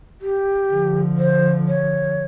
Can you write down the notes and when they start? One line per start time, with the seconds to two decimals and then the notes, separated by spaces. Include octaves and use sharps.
0.21 G4
0.71 D3 F3
1.18 C5
1.67 C#5